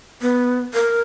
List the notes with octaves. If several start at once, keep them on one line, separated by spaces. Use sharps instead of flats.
B3
A#4